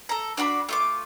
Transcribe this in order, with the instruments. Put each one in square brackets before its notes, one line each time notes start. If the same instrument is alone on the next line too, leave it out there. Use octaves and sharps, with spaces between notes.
[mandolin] A4 A#5
D4 F#4 D5 B5
A3 F4 D6